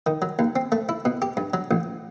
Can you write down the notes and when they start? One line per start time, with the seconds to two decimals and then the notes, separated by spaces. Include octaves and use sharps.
0.07 D#3
0.22 F#3
0.39 D#2
0.56 C4
0.72 A3
0.89 E4
1.05 B2
1.22 G4
1.37 G2
1.54 F#3
1.71 A1